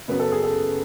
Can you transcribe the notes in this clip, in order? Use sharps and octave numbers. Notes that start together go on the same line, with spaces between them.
F#2 C#3 F#3 B3 B4
A4
G#4
A4